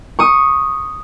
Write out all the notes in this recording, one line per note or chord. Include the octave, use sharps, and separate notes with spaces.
C#6 D#6